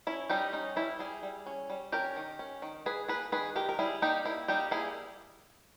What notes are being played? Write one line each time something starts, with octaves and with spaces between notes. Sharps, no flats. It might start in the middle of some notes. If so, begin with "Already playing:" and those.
C#4 E4
G3 D#4 G4
C#4 D#4
G3 E4
G3 E4 G#4
G3
C#4
G3
C#4 G4 A#4
D#3
C#4
D#3
D#3 G#4 B4
A#3 G#4 B4
D#3 G#4 B4
D#3 G4 A#4
A#4
G3 E4 G#4
A#3 D#4 G4
A#3 E4
G3 D#4 G4
A#3 E4 G#4